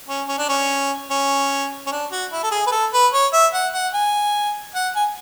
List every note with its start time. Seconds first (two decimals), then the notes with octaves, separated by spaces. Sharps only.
0.08 C#4
0.28 C#4
0.39 D4
0.49 C#4
1.11 C#4
1.87 C#4
1.92 D4
2.11 F#4
2.32 E4
2.44 A4
2.51 G#4
2.67 B4
2.72 A4
2.93 B4
3.13 C#5
3.33 E5
3.54 F#5
3.74 F#5
3.94 G#5
4.75 F#5
4.96 G#5